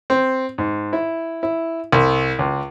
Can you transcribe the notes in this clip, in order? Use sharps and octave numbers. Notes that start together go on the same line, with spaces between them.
C4
G#2
E4
E4
C2
C#2